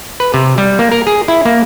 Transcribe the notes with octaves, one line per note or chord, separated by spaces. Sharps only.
B4
C3
G3
A#3
A#4
G#4
E4
A#3